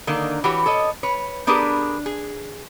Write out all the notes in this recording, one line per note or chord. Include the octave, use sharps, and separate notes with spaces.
D3 D#3 A#3
E3 F#4 G4 C#5
A4 C#5 D#5
B4 C#5
B3 D4 G4 G#4 A#4 B4
G#4